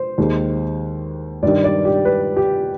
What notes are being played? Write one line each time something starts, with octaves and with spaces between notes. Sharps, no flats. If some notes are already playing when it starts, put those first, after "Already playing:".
Already playing: C5
D#2 D#3 G#3
G2 D#3 G3 D5
D5
G4
B4
G4